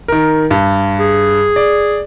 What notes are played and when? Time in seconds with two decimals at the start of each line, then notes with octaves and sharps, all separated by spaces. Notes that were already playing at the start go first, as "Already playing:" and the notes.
0.08 D#3 A#4
0.51 G2
1.00 G#4
1.56 D5